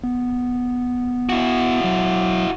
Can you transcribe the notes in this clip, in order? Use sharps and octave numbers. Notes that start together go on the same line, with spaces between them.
B3
E4 F#4
F#3